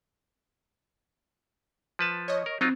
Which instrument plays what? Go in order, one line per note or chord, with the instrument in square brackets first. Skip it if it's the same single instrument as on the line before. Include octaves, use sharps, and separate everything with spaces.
[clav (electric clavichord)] F3 B4 A5
[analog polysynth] C#5 D#5
[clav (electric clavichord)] A#4
[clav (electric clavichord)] F#3 D#4 F4 [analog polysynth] C4